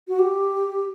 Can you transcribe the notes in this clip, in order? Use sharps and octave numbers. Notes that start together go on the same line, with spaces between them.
F#4
G4